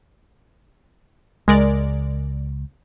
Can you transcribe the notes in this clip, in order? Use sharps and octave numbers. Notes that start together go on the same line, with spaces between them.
C#2 G#3 A#4 D5